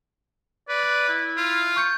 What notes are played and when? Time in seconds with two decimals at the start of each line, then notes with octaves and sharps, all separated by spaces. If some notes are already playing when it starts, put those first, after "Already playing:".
0.69 B4 D5
0.83 F#6
1.09 E4
1.37 F4
1.76 C#6 G6 C#7